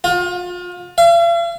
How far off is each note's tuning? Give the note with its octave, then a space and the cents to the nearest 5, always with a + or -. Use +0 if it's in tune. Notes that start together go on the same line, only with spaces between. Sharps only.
F4 +35
F5 -45